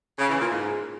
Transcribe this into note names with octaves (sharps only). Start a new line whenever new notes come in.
C#3
E3
A#2
G#2